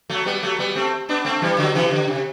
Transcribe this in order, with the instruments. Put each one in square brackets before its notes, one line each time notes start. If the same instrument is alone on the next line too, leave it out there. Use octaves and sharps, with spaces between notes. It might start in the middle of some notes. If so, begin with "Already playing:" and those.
[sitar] F#3 A3
G3 B3
F#3 A3
G3 B3
A3 C4
B3 D4
A3 C4
E3 G3
D3 F#3
C3 E3
D3
C3